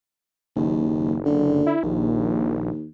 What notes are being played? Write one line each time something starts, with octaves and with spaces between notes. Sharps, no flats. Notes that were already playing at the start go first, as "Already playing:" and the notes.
F#1 D#2
D3
E4
A#1 D#2